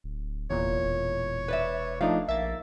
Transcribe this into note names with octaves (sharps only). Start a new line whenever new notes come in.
D1
F1 E2 A#2 C#5
E1
B4 D5 E5
F3 A3 D4 D#4 F5
A#1 A#3 E5 A6